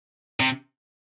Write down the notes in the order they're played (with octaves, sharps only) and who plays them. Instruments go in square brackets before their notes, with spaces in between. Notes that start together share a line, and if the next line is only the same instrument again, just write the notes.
[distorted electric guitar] C3